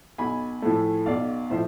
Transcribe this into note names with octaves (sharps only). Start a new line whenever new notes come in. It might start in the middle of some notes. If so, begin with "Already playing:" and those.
B1 G#5 B5
A2 F3 A3
B1 D5 F5
A2 F3 C5 E5